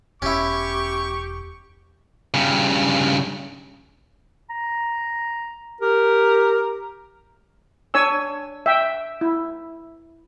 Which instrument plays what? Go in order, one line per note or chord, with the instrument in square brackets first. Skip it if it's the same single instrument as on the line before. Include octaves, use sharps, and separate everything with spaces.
[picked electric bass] E1 [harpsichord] C#4 E4 [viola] G4 [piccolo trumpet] C#6
[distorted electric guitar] G2 C#3
[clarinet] A#5
[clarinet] G4 [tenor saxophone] A#4
[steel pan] D4 C#5 G#5 E6
E5 G5
E4